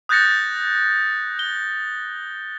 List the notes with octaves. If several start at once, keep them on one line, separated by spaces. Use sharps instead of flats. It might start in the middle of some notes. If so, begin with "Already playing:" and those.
D#6 F#6 G6 A6 A#6 C#7
G7